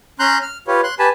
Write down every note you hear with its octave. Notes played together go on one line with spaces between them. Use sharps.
C#4 A#5 C6 F#6 G6
F6
F4 G4 B4 C#5
C6 F#6
G4 B4 G#5 A5 B5